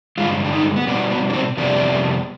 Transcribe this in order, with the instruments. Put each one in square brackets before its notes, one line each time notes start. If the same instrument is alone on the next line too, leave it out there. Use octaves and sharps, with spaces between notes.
[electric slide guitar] G2 D3 G#3 F4
D4
D#4
B3
B2 G3 B3 C4
B3
D4
C4
F2 C3 G3 B3 D4